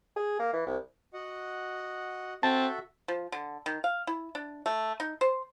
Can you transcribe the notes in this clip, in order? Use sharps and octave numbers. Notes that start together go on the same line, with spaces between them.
G#4
A#3
E3
C2
F#4 D#5 F#5
C4 F#4 A4 E5 A5
F3
D3
D#3
F5
E4
D4
A3
D#4
C5